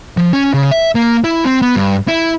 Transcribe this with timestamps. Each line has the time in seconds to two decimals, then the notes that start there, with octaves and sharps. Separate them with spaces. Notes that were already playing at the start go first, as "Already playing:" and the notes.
0.17 F3
0.33 C#4
0.54 C#3
0.71 E5
0.95 A#3
1.24 E4
1.45 C4
1.62 B3
1.76 G2
2.08 E4